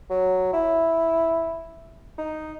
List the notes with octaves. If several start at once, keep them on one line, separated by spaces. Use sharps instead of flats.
F#3
E4
D#4